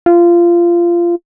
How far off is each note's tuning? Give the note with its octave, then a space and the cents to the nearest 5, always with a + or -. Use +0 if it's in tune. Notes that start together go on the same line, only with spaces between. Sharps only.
F4 -20